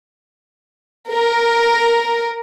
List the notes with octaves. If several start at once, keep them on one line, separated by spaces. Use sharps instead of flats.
A#4